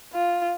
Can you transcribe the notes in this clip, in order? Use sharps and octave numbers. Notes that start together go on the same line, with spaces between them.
F4